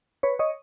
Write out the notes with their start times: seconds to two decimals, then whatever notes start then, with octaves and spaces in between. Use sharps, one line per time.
0.23 B4 C#5
0.39 C#5 D#5